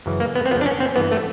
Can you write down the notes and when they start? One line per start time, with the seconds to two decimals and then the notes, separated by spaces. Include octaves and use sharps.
0.06 F#2 C#3 E3
0.20 A#3
0.35 B3
0.46 C4
0.51 F2 C#3 F3 B3
0.61 D4
0.66 C#4
0.80 C4
0.96 G2 E3 B3
1.12 A3